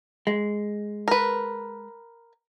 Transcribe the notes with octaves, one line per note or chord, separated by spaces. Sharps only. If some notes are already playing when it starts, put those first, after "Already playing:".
G#3
A#4 B4